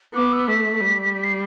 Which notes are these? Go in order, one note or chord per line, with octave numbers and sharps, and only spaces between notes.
B3 D6
E6
A3 B6
G3
B6
C7